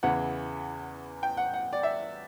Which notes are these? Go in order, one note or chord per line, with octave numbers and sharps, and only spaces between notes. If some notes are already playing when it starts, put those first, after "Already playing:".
E2 C#3 E3 F#5
G5
F#5
F#5
D5
E5